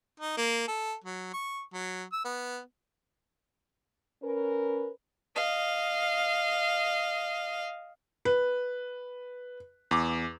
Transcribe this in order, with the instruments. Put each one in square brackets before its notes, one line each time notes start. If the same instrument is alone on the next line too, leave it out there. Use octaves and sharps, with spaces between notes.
[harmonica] D#4
A#3
A4
F#3
C#6
F#3
E6
B3
[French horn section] C#4 A#4 B4
[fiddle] D#5 F5
[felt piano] B4
[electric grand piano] E2 D6